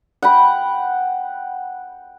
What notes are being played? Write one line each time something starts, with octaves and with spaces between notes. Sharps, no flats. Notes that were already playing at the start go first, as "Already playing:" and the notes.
F#5 G5 B5